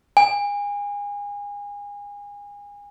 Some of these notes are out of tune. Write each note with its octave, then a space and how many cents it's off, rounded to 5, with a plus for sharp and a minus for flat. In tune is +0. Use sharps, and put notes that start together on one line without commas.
G#5 -30